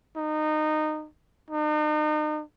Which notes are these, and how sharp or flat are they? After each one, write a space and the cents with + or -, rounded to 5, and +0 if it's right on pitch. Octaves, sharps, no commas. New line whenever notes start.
D#4 -20
D#4 -40